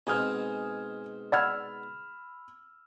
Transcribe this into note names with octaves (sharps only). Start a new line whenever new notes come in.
G#2 B2 C4 G#5 D#6 F6
D5 F#5 B5 E6 F6 G#6